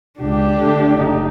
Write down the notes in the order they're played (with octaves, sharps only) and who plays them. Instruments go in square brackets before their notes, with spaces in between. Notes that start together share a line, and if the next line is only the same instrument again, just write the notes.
[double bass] C#2 [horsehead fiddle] D4 G4
[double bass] D3 A3
F#1 D#4